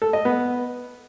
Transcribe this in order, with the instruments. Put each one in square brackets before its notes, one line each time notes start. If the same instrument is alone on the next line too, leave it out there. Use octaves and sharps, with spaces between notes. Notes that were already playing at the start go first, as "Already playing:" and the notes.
[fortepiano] A4
D#5
B3